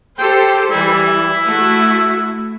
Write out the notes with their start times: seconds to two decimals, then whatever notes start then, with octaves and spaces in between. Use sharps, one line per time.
0.19 G4 A4 C5 G5
0.71 E3 G3 E4
1.46 A3 F#4